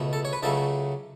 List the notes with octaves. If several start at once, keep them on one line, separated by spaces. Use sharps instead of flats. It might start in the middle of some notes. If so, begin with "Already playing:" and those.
Already playing: C#2 B2 A3
A4
C#5
B4
C#2 C#3 F#3 A3 A4